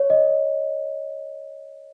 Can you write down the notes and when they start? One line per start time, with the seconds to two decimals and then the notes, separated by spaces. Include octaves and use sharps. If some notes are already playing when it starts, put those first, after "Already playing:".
Already playing: C#5
0.10 D#5